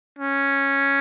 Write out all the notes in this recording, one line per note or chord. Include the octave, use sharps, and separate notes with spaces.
C#4